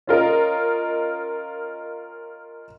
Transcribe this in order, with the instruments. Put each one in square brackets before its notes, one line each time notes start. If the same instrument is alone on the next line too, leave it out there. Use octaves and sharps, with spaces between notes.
[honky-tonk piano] C#4 F4 A#4 D#5